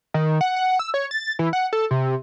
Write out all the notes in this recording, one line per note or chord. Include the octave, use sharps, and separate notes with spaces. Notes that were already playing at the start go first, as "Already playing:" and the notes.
D#3
F#5
F#5
E6
C#5
A6
E3
F#5
A4
C3